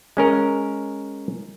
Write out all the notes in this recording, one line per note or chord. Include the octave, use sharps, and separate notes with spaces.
G#3 C#4 A#4